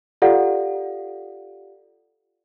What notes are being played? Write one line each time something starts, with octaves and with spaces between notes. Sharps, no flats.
F4 G4 A4 D5 F5 F#5